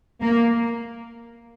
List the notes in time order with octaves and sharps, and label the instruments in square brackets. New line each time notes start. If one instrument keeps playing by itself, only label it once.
[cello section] A#3